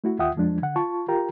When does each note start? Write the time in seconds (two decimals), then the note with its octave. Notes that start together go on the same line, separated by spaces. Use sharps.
0.04 A3 E4 F#4
0.19 D#2 F4 E5 F#5 G5 D#6
0.36 F2 F3 G#3 D4
0.62 D3 F#5
0.76 F4 A5 C#6
1.08 F4 G4 A#4 G5 A#5